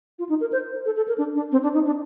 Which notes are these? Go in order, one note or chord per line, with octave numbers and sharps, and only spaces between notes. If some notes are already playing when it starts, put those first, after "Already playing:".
F4
D#4
A#4
C5
A4
A4
A#4
D4
D4
C4
D4
D#4
D4